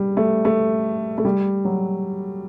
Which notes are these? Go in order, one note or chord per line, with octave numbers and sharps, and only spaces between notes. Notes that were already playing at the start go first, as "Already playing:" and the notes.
Already playing: G3
A3
A3
A3
G3
F#3